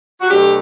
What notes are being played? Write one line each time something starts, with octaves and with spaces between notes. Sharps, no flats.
F#4
B2 F#3 A3 D4 G4